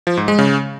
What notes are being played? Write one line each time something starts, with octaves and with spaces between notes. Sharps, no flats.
F3
G#2
G#3
C#3